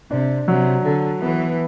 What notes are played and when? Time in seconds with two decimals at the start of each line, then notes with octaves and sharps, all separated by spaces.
0.11 C3 D4
0.47 C3 F#3
0.84 D3 A4
1.22 E3 B3